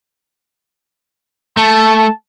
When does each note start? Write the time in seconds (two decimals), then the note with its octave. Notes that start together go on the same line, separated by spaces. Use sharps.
1.57 A3 A5